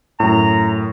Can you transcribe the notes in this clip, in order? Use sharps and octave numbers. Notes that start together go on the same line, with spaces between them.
F#2 A2 A#5